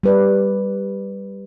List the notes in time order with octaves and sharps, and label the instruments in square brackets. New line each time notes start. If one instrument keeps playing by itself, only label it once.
[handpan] G3 B4 D5